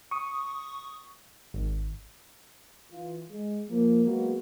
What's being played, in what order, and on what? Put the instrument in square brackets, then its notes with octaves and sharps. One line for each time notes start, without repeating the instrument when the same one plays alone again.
[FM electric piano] C#6 D#6
[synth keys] G#1
[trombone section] E3 F4
G#3
F3 A#3
F#3 G#3 A#3 B3 F#4